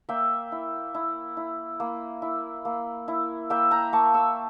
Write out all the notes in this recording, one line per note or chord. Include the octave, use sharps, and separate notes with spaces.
A#3 E5 G5
E4
E4
E4
A#3
E4
A#3
E4
A#3 E5 G5
G5 A#5
A#3 A5 C#6
C#6 E6